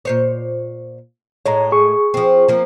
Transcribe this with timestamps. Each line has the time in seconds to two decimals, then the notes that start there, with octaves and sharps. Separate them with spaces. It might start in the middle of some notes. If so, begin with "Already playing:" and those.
0.05 A#2 C5 C#5
1.46 A2 G#3 C#5 A#5
1.72 G#4 C#6
2.14 F3 C4
2.48 F3 A#3